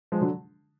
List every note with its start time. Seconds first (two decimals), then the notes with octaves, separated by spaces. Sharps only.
0.12 F3 G#3
0.21 D3 F#3